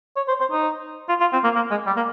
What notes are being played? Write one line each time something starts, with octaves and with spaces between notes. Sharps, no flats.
C#5
C5
C5
D#4
F4
F4
C4
A#3
A#3
G#3
G3
A#3